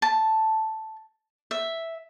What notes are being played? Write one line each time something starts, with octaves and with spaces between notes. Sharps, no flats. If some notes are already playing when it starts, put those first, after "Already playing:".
A5
E5